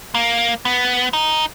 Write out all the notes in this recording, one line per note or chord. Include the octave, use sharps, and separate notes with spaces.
A#3
B3
D#4